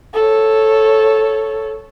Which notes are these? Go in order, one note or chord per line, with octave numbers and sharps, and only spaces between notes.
A4 C#5